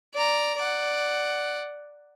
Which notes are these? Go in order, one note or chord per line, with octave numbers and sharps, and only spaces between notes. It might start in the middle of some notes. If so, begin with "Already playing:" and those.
D5 A#5
D5 F#5